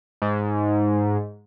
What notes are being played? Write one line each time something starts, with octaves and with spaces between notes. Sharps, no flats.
G#2